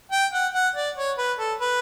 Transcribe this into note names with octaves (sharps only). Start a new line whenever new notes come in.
G5
F#5
F#5
D5
C#5
B4
A4
B4